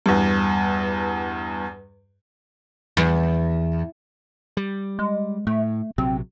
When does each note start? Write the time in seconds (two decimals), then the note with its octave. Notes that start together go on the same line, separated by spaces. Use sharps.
0.06 E2 G2
2.97 E2
4.57 G3
4.99 G#3
5.47 A2 A3
5.98 A#1 C3 F#3 C4